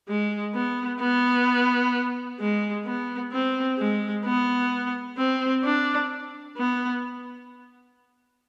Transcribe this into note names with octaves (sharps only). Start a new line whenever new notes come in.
G#3
B3
B3
G#3
B3
C4
G#3
B3
C4
D4
B3